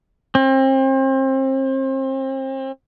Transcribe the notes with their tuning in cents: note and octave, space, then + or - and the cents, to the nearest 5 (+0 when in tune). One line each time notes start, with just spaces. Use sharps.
C4 +35